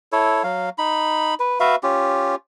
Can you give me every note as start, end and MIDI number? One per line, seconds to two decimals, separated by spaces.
0.12 0.43 64
0.12 0.43 69
0.12 0.43 73
0.44 0.69 54
0.44 0.69 77
0.78 1.34 63
0.78 1.34 83
1.40 1.60 71
1.60 1.76 66
1.60 1.76 71
1.60 1.76 76
1.60 1.76 77
1.83 2.35 61
1.83 2.35 65
1.83 2.35 67